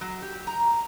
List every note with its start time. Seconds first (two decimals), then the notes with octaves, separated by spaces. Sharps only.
0.01 F#3
0.22 G4
0.47 A#5